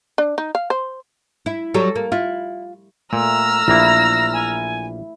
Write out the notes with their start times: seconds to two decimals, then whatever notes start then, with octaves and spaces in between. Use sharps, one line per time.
0.18 D4
0.38 D#4
0.55 F5
0.70 C5
1.46 E4
1.74 F#3 G3 A4
1.95 A#3
2.12 E4 F4
3.13 A#2 A3 A#5 E6 F6
3.68 A#1 A#3 E4 E5 A#6
4.33 G#5